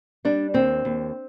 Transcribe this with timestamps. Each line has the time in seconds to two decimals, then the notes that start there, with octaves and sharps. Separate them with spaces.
0.25 G3 D4
0.54 D#2 C4
0.85 D#2